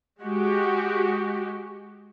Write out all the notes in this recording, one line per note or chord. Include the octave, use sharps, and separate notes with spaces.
G#3 F#4 G4